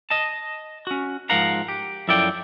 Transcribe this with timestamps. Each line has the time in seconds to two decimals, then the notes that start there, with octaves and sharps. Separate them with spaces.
0.10 D#5 A5
0.87 C#4 F#4
1.30 G#2 F3 A#4 F5 F#5 A#5
1.68 G4
2.08 F#2 F3 E4 A4 D5 G5